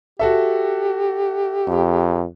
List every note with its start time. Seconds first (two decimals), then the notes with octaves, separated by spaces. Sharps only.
0.19 F#4 G4 A4 E5
1.67 F2